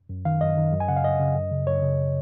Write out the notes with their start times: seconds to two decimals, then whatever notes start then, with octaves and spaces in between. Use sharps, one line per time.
0.09 F#2
0.25 D#3 F5
0.41 F#2 D#5
0.57 D#3
0.73 F#2
0.80 G#5
0.88 C#3 F#5
0.97 F5
1.04 F#2 D#5
1.20 C#3
1.36 F#2
1.52 C#3
1.67 F#2 C#5
1.82 C#3